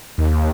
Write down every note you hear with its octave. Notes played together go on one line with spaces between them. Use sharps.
D#2